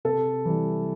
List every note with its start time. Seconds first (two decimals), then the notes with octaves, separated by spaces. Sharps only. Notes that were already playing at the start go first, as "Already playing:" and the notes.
0.05 C3 A4
0.45 E3 G3